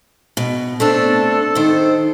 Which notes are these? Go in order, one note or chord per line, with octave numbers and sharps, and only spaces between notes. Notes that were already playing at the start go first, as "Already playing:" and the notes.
B2
A3 C4 D4 A4
D#3 C5